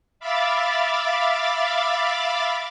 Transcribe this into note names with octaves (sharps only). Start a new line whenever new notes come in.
E5 F5 B5 D6 A6